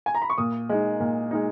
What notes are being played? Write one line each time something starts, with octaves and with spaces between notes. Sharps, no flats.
G#5
A#5
B5
C#6
A#2 D#6
G#3 D#4
A#2
G#3 D#4